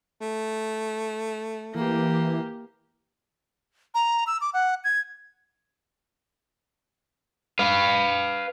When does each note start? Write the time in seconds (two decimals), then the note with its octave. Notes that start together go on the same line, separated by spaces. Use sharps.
0.21 A3
1.75 E3 A#3 G4
3.94 A#5
4.27 E6
4.41 D6
4.54 F#5
4.84 G#6
7.59 B4 F5